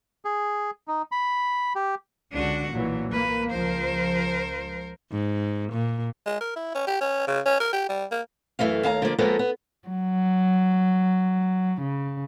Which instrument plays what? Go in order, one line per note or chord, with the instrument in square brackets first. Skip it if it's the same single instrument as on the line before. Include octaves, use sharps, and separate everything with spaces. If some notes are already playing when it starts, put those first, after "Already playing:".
[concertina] G#4
D#4
B5
G4
[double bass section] C#2 D3 [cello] D4 F#4
[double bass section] B1 E3 F#3 [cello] A#2
[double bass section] A#3 [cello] B4
[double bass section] C#2 F3 [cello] A#4 C5
[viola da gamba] G#2
A#2
[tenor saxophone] G#3
A#4
E4
C#4
G4
C#4
C#3
C#4
A#4
G4
G3
A#3
[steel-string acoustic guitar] F#2 D#3 E3 A3 F5
D#2 F5 A5 A#5
D3 F3 A#3 D5
F3 G#3 A#3 B3 D#4 A4
B3
[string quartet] F#3
C#3